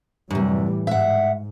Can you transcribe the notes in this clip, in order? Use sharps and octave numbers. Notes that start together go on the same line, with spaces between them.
F#2 A2 C3 E3 G3
G#2 E5 F#5